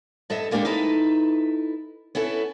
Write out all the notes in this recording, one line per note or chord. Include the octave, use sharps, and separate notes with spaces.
G2 A4 D#5 E5
G#3 A#3 D4 F4 G4 A4
D#4 E4 A4 B4
B3 C#4 E4 A4